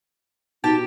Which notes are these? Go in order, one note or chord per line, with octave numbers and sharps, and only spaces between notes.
B2 D#4 G4 G5 A5